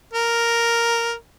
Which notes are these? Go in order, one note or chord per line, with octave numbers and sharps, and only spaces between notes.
A#4